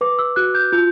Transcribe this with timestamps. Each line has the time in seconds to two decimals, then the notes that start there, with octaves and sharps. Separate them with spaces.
0.01 B4 D6
0.19 E6
0.36 F#4 F#6
0.55 G6
0.72 F4 G6